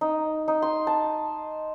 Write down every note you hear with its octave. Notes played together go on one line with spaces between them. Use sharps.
D#4
D#4
C6
A5